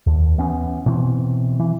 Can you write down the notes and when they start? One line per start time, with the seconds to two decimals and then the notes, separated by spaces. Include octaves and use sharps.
0.06 D#2
0.38 E3 B3 C#4
0.86 B2 E3 C4
1.60 E3